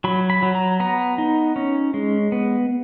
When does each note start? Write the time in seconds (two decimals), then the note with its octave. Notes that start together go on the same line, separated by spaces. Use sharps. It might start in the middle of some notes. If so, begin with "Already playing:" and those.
0.04 F#3 B5
0.30 B5
0.42 F#3
0.55 A#5
0.80 B3 A#5
1.18 D#4
1.56 C#4
1.94 G#3
2.32 B3